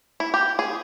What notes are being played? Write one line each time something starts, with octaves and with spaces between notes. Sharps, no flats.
E4
G4
G#4